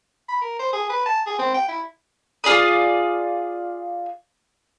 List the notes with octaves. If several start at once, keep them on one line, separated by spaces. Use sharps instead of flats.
B5
A#4
C5
G#4
B4
A5
G#4
C4
G5
E4
F4 G#4 D5 D#6